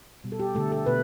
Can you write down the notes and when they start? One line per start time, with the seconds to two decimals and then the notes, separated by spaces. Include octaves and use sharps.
0.24 B2 G3
0.32 A4
0.40 G4
0.55 D3 A3 A4
0.72 A4
0.86 B2 B4